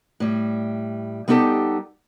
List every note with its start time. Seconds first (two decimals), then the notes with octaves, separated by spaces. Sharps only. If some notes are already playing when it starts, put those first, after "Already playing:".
0.20 A2 G3
1.28 G3 B3 D#4 G4 A4